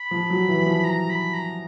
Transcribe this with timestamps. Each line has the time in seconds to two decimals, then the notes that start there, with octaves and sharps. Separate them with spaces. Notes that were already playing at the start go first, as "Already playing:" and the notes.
Already playing: B5
0.11 F3
0.30 F#3
0.48 E3
0.66 F3
0.84 A#5
1.10 B5
1.34 A#5